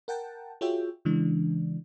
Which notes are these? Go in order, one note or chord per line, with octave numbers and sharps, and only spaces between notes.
A#4 F#5 G5 A5
F4 F#4 G#4 C#5 E5 G5
C#3 E3 G#3 D4